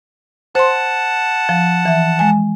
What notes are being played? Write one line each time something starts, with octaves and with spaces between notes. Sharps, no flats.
C5 F#5 A5 C6
F3
E3 E5
G#3 G#5